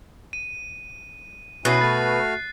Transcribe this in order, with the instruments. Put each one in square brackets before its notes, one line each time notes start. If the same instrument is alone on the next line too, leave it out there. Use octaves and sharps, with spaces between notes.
[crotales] D#7
[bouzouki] B2 B4 [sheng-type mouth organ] C#4 E4 F#4 [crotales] F#6 C7
[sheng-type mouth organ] A3 F#4 F6 [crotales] A6